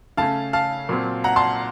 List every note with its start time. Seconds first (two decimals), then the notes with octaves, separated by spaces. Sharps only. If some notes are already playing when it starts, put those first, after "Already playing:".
0.17 C#3 A3 C#4 F5 A5
0.53 F5 A5
0.89 A#2 F#3 C4
1.24 F#5 A#5
1.36 A5 C6